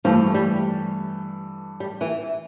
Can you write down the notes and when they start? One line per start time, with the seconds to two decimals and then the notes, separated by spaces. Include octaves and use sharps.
0.05 G2 E3 F3 A3
0.34 G3
1.80 G3
2.01 E3